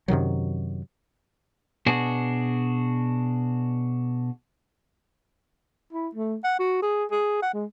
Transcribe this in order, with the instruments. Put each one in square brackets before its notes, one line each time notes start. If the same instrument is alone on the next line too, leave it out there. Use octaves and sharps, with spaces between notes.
[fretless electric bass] F#2 C3 D#3 F#3
[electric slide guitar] B2 D4 F#4 G#4
[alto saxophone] E4
A3
F#5
F#4
G#4
G#4
F#5
G#3